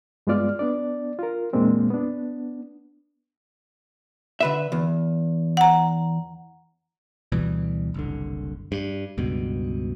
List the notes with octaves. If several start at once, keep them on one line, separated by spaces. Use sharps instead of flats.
G2 G#3 B3 F4 D5 F6
B3 D4 D5
F4 A#4
E2 A#2 G#3 A#3 C4 D4
B3 D4
D3 B4 E5
E2
F#5 A#5
D2 B2 E3 G3
F#1 C2 D3
G2
C#2 G2 B2